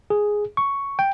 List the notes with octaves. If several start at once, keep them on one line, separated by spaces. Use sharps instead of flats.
G#4
C#6
G5